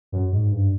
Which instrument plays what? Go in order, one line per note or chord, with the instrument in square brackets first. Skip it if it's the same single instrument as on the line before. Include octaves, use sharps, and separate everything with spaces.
[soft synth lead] F#2
G#2
G2